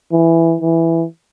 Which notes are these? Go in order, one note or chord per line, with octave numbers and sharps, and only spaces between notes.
E3
E3